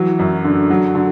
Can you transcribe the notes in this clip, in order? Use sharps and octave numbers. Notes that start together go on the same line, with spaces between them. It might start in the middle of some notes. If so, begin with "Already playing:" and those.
Already playing: E3 F#3
F#2
D3
F#3
D3